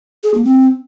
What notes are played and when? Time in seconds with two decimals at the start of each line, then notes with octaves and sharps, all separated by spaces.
0.24 G#4
0.34 A#3
0.44 C4